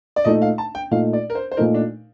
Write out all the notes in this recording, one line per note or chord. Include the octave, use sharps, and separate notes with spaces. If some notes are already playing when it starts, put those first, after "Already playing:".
D5
A#2 A3 D#4 D#5
F5
A5
G5
A#2 A3 D#4 F5
D5
A#4
C5
C5
A#2 A3 D#4 A#4
D4